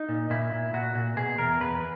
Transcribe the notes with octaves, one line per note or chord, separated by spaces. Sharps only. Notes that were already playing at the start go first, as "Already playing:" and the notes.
Already playing: D#4
A#2
A#2 E4
A#2
A#2 F#4
A#2
B2 G#4
E2 A#4
E2 B4